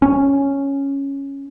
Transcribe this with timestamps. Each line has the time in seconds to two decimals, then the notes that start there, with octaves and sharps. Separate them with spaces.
0.02 C#4